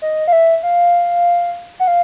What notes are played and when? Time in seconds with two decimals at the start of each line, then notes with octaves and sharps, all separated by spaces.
0.02 D#5
0.28 F5
0.33 E5
0.63 F5
1.80 F#5
1.87 F5